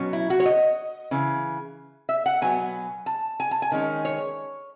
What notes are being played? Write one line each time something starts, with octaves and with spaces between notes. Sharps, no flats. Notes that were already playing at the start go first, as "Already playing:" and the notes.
Already playing: B2 F#3 C#4
E4
F#4
C#5
D#5
C#3 E3
E5
F#5
B2 F#3 B3 G#5
A5
G#5
A5
G#5
D#3 G#3 C#4
C#5